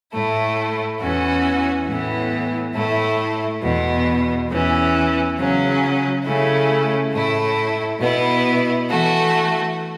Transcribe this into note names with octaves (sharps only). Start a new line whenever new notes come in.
A2 A3 E4
E2 E3 C#4 F#4
A2 E3 B3
A2 A3 E4
E2 B2 B3
E2 E3 C#4
C#3 F#3 C#4
C#3 A3 C#4 E4
A2 A3 E4
B2 B3 E4
E3 A3 F#4